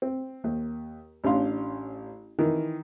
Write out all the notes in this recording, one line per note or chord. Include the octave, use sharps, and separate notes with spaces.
C4
D#2
A1 C#4 D4 F5 C6
D#3 E3